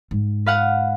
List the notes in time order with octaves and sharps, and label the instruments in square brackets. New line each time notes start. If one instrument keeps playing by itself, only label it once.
[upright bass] G#2
[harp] B4 F5 F#5